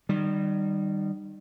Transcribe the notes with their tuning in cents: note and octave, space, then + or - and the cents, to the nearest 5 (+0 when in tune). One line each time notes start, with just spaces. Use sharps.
D#3 -25 G3 +0